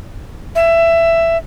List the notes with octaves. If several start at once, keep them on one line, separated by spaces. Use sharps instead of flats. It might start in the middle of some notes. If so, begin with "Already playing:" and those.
E5